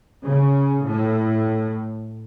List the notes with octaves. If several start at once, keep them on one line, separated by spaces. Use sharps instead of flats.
C#3
A2